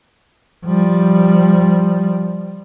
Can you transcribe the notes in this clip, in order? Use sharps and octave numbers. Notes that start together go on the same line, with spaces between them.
F3 G3